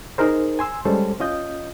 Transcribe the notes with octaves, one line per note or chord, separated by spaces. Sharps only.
D#4 G#4 A#4 C5
G#5 C6 E6
G3 G#3 C#4 A4 C5
C#4 F4 D#5 G6